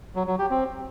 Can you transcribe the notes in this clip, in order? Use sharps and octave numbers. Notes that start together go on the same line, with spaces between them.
F#3
F#3
G4
C4